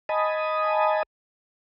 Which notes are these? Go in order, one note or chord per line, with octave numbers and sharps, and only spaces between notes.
D#5 G#5 A5 B5 D#6